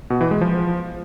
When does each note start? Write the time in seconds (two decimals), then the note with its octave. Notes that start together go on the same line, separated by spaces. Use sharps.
0.10 B2
0.21 E3
0.31 G#3
0.41 F3